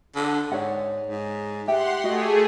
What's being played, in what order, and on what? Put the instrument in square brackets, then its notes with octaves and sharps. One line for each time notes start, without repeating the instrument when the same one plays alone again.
[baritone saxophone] D3
[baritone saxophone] G#2 [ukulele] C#5 D5 F#5
[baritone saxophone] G#2
[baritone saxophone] G4 [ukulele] E5 G5 [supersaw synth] F#5 C6
[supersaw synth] A3 G#4 [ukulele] F#4 D#5